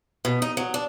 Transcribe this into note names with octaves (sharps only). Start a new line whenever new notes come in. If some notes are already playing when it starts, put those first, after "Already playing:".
B2
D#4
F#3
D4